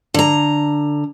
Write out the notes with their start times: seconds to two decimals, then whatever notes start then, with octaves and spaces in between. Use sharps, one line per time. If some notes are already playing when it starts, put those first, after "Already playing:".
0.14 D3 A#5